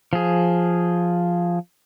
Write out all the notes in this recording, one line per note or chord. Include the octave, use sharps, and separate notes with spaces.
F3 G#4